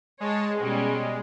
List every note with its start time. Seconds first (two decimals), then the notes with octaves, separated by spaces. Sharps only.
0.20 G#3 C#5 A5
0.59 B2 G3 C#4